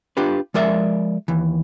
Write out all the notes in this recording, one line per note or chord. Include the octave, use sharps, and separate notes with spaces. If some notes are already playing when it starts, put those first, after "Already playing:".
D4 F4 G4 B4
F3 G#3 A#4 D5 E5
D#2 E3